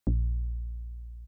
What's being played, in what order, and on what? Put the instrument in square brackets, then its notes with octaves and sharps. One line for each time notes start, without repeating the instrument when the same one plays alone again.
[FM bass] A#1